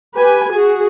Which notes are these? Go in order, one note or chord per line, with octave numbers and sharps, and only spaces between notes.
G4 B4 G#5
F#4 G#4